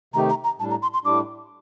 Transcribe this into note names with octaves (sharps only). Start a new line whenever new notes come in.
C3 D#3 A3 D#4 G4 A#5
A#5
A#5
A2 G3 D4 A5
A#5
C6
C6
A2 G3 D4 D6